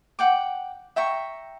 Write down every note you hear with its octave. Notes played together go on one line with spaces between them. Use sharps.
F#5 G5 D6
E5 G5 A#5 C#6